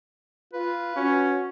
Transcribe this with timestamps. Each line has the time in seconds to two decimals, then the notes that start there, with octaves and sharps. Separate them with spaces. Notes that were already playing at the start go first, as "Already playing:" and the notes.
0.54 F4 B4
0.97 C#4 F#4